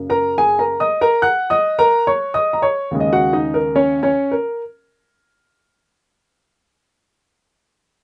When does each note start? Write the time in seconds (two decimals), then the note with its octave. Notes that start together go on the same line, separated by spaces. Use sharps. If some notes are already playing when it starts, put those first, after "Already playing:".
Already playing: F#2 C#3 A#3
0.10 A#4 A#5
0.38 G#4 G#5
0.59 A#4 A#5
0.80 D#5 D#6
1.01 A#4 A#5
1.22 F#5 F#6
1.50 D#5 D#6
1.79 A#4 A#5
2.07 C#5 C#6
2.34 D#5 D#6
2.53 A#5
2.62 C#5 C#6
2.91 D#2 C#3 G#3
3.00 D#5
3.12 F#4 F#5
3.33 D#4 D#5
3.54 A#4
3.76 C#4 C#5
4.03 C#4 C#5
4.31 A#4